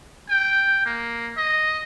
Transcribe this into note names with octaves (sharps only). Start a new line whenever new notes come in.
G5
A#3
D#5